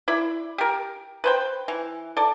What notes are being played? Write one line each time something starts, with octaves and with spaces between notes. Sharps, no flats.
E4 D5 B5
G4 A#4
B4 C5 G5
E3
A4 D5